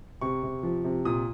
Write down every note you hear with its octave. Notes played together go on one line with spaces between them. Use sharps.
C3 C#6
C3
F3
C3
A#2 D#6